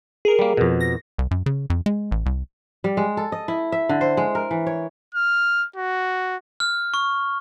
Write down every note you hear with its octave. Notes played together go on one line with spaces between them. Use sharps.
G#4 A#4
G3 A#3
F2 B2
A#6
C2
F#2
C#3
F2
G#3
A1
C2
G3
G#3
A4
D#5
E4
E5
D3
C5
G#3
A#4
E3
C#5
F6
F#4
F6
C#6